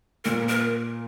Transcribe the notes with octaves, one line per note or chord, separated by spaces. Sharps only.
A#2 A#4
A#4